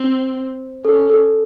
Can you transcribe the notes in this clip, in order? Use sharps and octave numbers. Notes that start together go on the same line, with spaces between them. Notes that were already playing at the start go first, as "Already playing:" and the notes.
Already playing: C4 C5
C#4 A4
A4